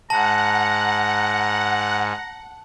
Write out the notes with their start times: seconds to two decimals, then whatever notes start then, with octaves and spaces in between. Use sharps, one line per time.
0.10 G#2 F#5 A5 A#5